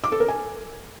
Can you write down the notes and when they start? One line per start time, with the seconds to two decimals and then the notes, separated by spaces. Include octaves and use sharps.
0.04 D6
0.12 A4
0.20 A#4
0.28 G#5